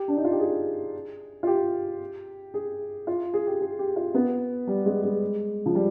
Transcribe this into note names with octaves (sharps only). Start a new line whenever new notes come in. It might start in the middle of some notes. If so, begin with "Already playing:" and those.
Already playing: G4
D4
D#4
F4
G4
G#4
F4
G4
G#4
F4
G#4
G4
G#4
G4
F4
B3
G3
G#3
G#3
F3
G3